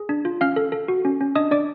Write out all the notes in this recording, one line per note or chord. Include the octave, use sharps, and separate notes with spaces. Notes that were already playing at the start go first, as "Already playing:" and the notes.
Already playing: G#4
D4
F4
C#4 F5 F6
A4
A4
F#4
C#4
C#4
D4 D#5 D#6
D4 D5 D6